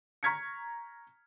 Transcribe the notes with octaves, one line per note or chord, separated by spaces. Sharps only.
A#5 C#6 F6 G#6 B6 C#7